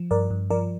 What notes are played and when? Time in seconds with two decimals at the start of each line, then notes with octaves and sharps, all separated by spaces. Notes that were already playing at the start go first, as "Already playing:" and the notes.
Already playing: F3
0.11 G2 A#4 D5
0.31 G2
0.50 F3 A#4 D5